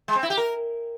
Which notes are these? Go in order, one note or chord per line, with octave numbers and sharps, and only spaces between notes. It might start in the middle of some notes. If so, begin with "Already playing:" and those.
G#3
C4
E4
G4
A#4